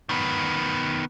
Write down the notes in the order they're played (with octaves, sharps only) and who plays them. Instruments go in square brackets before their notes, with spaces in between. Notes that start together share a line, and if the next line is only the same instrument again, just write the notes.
[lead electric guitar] D#3 B3